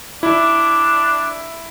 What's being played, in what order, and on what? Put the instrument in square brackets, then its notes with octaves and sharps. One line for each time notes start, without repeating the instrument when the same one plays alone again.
[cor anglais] D4 [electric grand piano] E4